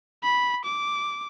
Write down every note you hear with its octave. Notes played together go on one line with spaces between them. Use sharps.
B5
D6